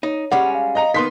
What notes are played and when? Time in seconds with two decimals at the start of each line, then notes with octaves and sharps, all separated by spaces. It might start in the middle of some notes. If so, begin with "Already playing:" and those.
0.03 D#4 C#5
0.31 G3 G#3 C#4 F#5
0.55 F5
0.75 D#5 A#5
0.94 D#3 B3 C6 B6